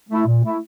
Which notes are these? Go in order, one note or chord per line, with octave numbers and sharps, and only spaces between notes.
A3 E4
A#2
A3 E4